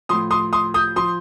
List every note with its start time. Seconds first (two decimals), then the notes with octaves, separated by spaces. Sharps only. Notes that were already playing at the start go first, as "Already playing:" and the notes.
0.09 A2 F3 C6 D#6
0.31 C6 D#6
0.53 C6 D#6
0.74 D#6 G6
0.96 F3 C6 D#6